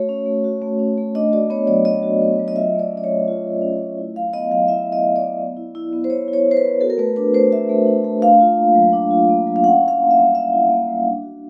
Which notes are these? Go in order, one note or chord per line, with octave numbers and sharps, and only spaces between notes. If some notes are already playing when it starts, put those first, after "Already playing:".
Already playing: A3 F#4 C#5
C#4
A3
F#4
A3
C#4
A3
D4 D#5
F#4 D5
B3 C#5
F#3 D5
D4 D#5
F#4
B3
F#3
D#5
F4 E5
A3 D5
C#4
D5
C#5
A3
F4
A3
C#4
A3
E4
F#3 F5
B3 D#5
F#3 F5
E4 E5
F#3
D#5
B3
D5
F#3
B3
E4
E4
B3
C5
B3 C#5
E4
C#5
E4
C5
B4
B3
F#4 A4
A#4
A3 B4
D4 B4
A3 C5
F#4 E5
A3
D4
A3
D4 F5
F4
A#3
F#3
D4
F4
A#3
F#3
F5
C#4 F#5
E4
F5
A#3
E5
G3
C#4 E5
E4
A#3
G3
D4
F#4